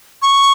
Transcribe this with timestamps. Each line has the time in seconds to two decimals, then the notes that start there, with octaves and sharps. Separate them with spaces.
0.22 C#6